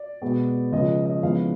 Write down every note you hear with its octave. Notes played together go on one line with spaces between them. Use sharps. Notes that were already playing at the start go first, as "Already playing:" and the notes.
Already playing: D5
B2 G#3 B3
C#2 C#3 F3 D#5
D#5
F2 C#3 E3 G#3 B3 F5